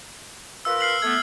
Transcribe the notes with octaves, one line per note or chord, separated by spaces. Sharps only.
F4 A#4 B4 E6
F6 C7 F#7
A3 B3 G#6